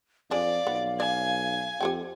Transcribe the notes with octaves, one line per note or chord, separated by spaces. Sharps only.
F2 D4 G#4 D5 F5
B1 B3
D5 G#5
F2 G4 A4 G5